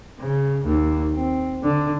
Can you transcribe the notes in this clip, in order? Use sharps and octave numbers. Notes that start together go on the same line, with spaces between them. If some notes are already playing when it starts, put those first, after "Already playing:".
C#3
D#2
C4
D3